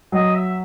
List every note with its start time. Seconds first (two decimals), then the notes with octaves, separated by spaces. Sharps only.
0.12 F#3 D#5
0.35 E5